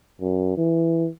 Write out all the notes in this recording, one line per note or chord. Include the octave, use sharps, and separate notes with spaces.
F#2
E3